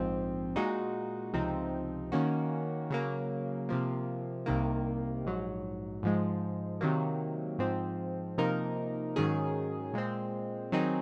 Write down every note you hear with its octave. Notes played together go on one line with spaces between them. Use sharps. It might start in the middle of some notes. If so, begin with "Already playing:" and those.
Already playing: A#1 G#2 F3 C4
A#2 G#3 D#4 F#4
C#2 C3 F3 C4 D#4
D#3 A#3 C#4 F#4
C#3 F#3 A#3
C3 F3 A#3
C2 C3 D#3 A#3
A#1 G#2 F#3
G#2 F3 G#3
C3 D#3 F#3 A#3
G#2 F3 C4
C3 F3 A#3 D#4 A#4
G#2 D#3 F#3 C#4 G#4
A#2 G#3 C4
D#3 F#3 C4 D#4 G#4